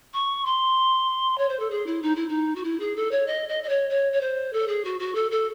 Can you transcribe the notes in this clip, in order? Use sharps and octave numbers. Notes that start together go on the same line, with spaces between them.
C#6
C6
C#5
C5
A4
G#4
E4
D#4
E4
D#4
F#4
E4
G#4
A4
C#5
D#5
D#5
D#5
C#5
C#5
C#5
C5
A4
G#4
F#4
F#4
A4
A4